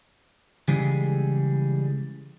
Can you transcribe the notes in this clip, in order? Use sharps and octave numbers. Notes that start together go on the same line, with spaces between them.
C#3 E3 G3 G#3 G#4